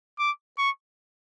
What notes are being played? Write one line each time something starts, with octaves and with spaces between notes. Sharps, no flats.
D6
C#6